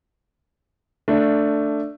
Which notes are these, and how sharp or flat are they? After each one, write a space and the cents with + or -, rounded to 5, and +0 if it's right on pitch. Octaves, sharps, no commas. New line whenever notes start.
A3 +10 D4 +0